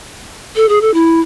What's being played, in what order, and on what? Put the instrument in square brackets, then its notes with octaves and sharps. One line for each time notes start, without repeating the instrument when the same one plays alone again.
[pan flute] A4
G#4
A4
E4